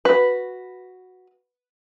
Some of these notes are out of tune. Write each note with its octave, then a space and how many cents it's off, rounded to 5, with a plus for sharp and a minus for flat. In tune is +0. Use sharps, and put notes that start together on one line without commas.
F#4 -5 B4 +0